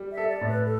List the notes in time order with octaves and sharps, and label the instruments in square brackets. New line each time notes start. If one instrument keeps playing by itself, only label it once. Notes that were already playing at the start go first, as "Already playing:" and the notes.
Already playing: [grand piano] G3
[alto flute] E5
[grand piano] A4
[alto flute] D5
[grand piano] A2
[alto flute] B4
A4